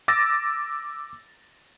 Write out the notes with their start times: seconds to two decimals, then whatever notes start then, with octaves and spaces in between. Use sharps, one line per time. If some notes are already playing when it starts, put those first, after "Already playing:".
0.08 D6 E6 A6 A#6